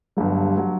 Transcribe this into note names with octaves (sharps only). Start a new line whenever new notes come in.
G1 G2 F#3
F#3